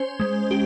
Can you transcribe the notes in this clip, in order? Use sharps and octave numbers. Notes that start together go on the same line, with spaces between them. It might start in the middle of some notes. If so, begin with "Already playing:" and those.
Already playing: C#4 C5
G#3
G4